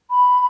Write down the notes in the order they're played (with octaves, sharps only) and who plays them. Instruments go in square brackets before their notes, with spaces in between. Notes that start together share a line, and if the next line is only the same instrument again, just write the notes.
[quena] B5